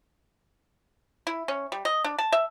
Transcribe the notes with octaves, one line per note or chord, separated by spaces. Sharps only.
E4
C#4
G3
D#5
D4
A5
E5